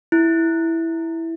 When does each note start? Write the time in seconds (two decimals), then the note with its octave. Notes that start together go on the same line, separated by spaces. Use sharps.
0.12 E4